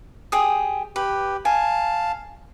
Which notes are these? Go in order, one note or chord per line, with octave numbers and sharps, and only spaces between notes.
G4 G#4 D#6
G4 B4
F5 G#5 A5